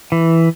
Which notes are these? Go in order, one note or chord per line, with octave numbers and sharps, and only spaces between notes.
E3